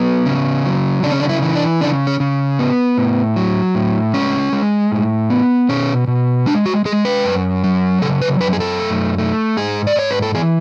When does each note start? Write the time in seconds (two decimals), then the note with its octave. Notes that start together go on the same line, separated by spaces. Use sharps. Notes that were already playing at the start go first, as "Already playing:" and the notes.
Already playing: F#3 B3
0.26 C#3
0.65 F#3
1.03 C#3 D4
1.12 C#4
1.20 D4
1.29 E4
1.42 E3
1.55 D4
1.81 C#3 D4
2.07 C#4
2.20 C#3
2.59 B3
2.98 A2
3.36 F#3
3.75 A2
4.14 G#3 C#4
4.53 G#3
4.92 A2
5.30 B3
5.69 B2 C#4
6.08 B2
6.46 G#3 D4
6.66 F#4
6.85 G#3 G#4
7.05 B4
7.24 F#2
7.63 F#3
8.02 C#3 A4
8.21 B4
8.40 F#2 B4
8.53 G#4
8.60 A4
8.80 A3
9.18 A3
9.57 G#2 G#4
9.87 D5
9.96 G#2 C#5
10.11 B4
10.22 A4
10.35 E3 G#4